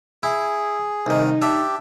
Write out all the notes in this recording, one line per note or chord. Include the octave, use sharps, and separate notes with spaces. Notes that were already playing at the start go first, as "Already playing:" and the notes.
E4 G#4
C2 D#3 D#4
D4 G4 E5